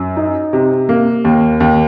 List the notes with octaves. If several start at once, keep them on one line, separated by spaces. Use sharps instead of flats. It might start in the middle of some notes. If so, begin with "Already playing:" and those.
Already playing: F#2
D#4
C3
A#3
D#2
D#2